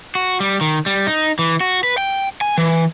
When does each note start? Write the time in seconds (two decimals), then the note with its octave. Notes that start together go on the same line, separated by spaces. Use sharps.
0.15 F#4
0.40 G3
0.61 D#3
0.86 G3
1.07 D#4
1.39 E3
1.61 F#4
1.84 B4
1.98 G5
2.41 G#5
2.58 E3